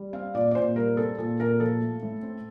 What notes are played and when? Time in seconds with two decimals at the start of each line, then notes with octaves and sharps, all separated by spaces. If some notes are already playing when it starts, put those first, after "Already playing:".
Already playing: G3
0.13 C4 F5
0.35 A#2 D5
0.51 D5
0.55 A#2 C5
0.76 G3 A#4
0.97 C4 A4
1.18 A#2 A4
1.40 A#2 A#4
1.60 F3 A4
1.82 A3
2.03 A2
2.23 C4